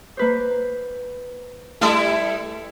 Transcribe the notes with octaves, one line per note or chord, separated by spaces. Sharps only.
A#3 B4 C5
G3 A3 E4 A4